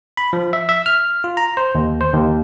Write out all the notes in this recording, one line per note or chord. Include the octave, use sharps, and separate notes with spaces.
B5
F3
E5
E5
F6
F4
A#5
C5
D#2
C5
D#2